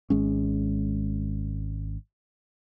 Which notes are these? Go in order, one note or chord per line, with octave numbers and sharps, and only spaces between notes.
G#1 G#3 C#4